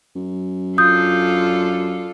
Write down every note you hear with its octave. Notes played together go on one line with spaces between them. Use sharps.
F#2
D4 F4 A4 D#6 G6